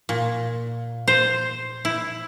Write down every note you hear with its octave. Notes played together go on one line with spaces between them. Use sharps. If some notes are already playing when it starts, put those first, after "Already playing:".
A#2
C5
E4